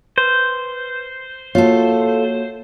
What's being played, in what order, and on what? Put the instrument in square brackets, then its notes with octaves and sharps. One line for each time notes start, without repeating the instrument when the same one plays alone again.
[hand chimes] B4 [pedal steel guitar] C5
[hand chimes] A#3 F#4 C#5 [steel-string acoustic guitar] F4 A4